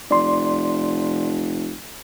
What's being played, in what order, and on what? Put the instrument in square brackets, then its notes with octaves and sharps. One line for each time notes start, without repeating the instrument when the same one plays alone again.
[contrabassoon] F1 [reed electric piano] D5 C6